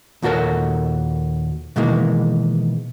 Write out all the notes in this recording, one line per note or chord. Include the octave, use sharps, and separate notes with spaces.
D#2 A#2 F#4 A4 A#4 C#5
B2 D#3 E3 G#3 A#3